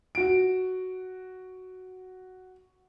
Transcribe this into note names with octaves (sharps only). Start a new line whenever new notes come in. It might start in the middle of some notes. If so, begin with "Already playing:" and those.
F#4 D7